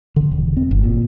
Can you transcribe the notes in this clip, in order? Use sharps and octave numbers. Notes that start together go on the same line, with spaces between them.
D3
E1
C4
G1
A#2